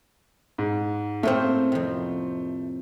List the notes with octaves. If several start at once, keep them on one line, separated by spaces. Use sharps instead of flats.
G#2
A2 A3 A#3 C4 C5
F2 C3